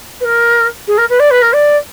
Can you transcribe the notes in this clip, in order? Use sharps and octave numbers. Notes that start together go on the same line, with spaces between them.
B4
A#4
G#4
A#4
B4
D5
B4
A#4
D5